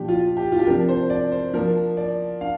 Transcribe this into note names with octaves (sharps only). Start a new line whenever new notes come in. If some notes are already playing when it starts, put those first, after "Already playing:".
Already playing: A#2 F3 D4 G4
F4
G4
F4
G4
C3 F3 D4 A#4
C5
D5
C5
F3 A#3 D4 A#4
D5
D4 F5